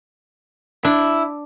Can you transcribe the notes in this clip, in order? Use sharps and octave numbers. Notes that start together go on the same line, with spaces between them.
D4 E4